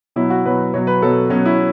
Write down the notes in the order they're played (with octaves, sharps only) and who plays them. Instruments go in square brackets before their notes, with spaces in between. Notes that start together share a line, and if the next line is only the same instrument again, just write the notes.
[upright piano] B2 F#3 E4
F#4
B2 F#3 B4
B2 F#3 C#5
B4
B2 F#3 A4
B2 F#3 C#4
E4